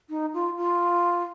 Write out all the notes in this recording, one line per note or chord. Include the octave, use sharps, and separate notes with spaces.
D#4
F4
F4